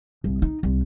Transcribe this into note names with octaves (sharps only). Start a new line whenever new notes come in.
C2
D#4
C2